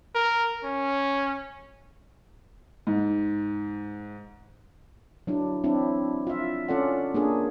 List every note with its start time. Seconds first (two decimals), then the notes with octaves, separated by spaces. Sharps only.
0.15 A#4
0.64 C#4
2.87 G#2
5.27 F#3 D4 E4
5.64 C4 D4 E4
6.27 F4 E5
6.68 C#4 F4 A4 D5 F#5
7.14 A#3 D4 G#4 A#4